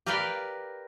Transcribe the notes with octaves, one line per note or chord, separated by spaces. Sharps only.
G4 A#4 B4 D5 F5 G5